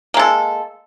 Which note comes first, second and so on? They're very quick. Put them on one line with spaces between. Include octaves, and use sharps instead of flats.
A#3 G#3 A4